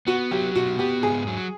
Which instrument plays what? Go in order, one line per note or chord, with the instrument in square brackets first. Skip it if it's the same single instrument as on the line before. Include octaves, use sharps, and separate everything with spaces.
[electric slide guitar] B3 [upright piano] F#4
[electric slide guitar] F#3 [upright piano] G4
[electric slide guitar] B2 [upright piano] F#4
[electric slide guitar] B3 [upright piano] G4
[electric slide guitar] G#2 [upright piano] G#4
[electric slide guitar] F#3